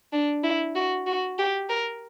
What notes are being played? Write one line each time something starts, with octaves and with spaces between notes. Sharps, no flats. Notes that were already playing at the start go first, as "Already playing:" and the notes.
D4
E4
F#4
F#4
G4
A#4